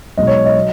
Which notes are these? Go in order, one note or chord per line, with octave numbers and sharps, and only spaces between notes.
B1 B2 G#3 D#5
C#5
D#5
F#3